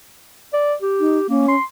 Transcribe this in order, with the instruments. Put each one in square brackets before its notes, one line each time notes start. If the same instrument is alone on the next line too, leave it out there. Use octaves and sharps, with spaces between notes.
[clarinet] D5
G4
[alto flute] D#4
[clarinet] A#3 [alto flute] C#4
[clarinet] C6